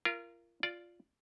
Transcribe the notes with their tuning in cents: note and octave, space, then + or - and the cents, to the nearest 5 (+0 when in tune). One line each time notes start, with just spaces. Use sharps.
F4 -30 A#4 +0
F4 +0 D5 +0